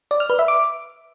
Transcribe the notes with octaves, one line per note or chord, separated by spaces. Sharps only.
D5
F6
B4
E5
D6